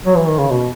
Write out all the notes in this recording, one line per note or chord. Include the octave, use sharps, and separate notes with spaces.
F#3
E3
D#3
C#3
B2